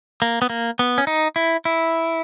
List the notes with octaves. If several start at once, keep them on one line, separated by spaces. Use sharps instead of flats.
A#3
B3
A#3
B3
C#4
D#4
E4
E4